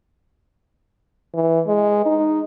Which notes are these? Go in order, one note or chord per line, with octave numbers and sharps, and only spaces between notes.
E3
G#3
D#4